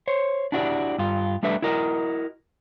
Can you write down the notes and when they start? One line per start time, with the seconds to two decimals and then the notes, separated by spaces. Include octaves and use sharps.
0.08 C5 C#5
0.52 D4 E4 F#4 G4 D5
0.99 G2 F4
1.43 G3 A3 D4 B4 E5
1.62 E4 F#4 A#4 D#5